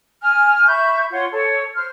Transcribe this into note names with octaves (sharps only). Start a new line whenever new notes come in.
G#5 F6
E5 B5 C#6 G6
F4 C#5 F#5 C6
A4 C#5
C5 F6